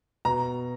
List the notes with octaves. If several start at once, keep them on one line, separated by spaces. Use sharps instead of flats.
B2 A#5